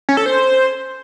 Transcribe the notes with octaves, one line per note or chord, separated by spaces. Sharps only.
C#4
A4
C5